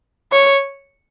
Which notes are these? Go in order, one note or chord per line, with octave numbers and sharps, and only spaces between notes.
C#5